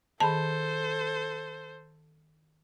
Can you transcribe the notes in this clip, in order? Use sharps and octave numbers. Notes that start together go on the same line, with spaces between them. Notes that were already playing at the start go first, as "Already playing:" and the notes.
D#3 G#4 A4 C5 A5 B5